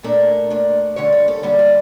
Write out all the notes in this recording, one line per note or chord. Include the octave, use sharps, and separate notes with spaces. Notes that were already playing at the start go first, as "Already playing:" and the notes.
A#2 A3 D4 A#4
A#2 A3 D4
G2 D3 G3 A#3 C#4 C#5
C#5
A4
G2 D3 G3 A#3 C#4 G4
F4